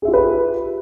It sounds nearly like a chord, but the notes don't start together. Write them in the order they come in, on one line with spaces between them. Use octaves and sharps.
G#4 E5 F4 G4 B4